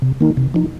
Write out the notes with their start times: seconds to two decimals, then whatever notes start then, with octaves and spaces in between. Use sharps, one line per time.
0.02 C3
0.20 D#3 A#3 D#4
0.37 C3
0.54 F3 D#4